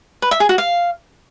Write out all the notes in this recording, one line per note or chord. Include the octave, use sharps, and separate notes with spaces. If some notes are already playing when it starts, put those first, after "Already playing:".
B4
E5
G#4
F#4
F5